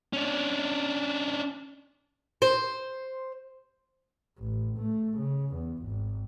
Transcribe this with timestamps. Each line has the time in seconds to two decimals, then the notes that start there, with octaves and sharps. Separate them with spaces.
0.13 C#4 D4
2.42 C5
4.38 A1
4.79 A3
5.18 C#3
5.54 E2
5.84 G#1